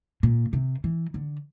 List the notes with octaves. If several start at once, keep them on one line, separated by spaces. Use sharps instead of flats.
A#2
C3
E3
D3